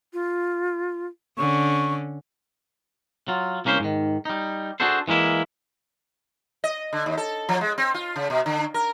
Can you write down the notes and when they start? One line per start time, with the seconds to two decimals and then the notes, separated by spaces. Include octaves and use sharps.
0.13 F4
1.38 D3 C#4 C#6
3.28 F#3 F4
3.65 C2 A#3 C#4 B4 C5
3.80 G#2 D#3
4.25 G3 D#4
4.80 D4 F#4 G#4 A4 C5
5.08 E3 G#3 A#3 E4
6.64 D#5
6.93 D3
7.06 D#2
7.17 A4
7.49 F3
7.61 G#3
7.78 C4
7.94 F4
8.16 C#3
8.30 B2
8.46 D3
8.74 A#4